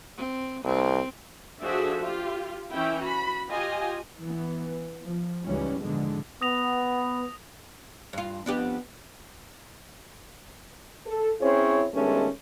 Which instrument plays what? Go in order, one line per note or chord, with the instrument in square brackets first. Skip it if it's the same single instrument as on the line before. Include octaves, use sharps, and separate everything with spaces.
[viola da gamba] C4
[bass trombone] C2 [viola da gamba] C4
[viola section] F3 D4 F#4 G#4 A4 E5
F4 G4
E3 C#4 E4 G5
F#4 B5
F4 G4 D#5 G#5
[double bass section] E3 B3
F3
C#2 G#2 E3 G3 C#4
A#1 E2 G#2 B2 D3 G#3
[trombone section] B3 [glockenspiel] D#6 A#6 F7
[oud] G2 F4
[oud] F2 D4 G4 [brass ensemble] B3
[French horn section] A4
C4 C#4 E4 G#4 C5 C#5
G2 D#3 G#3 A3 B3 C#4